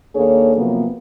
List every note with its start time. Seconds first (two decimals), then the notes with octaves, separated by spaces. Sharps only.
0.15 D#2 A#3 D4 G#4 A4 C#5
0.56 C3 F3 F#3 A#3 B3